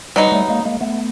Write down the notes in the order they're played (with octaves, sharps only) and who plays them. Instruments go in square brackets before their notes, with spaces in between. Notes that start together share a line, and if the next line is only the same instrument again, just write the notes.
[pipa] F#3 B3 D#4 [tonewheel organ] G3
[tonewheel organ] G3 A3
G#3 A#3
G#3 A#3
A3 B3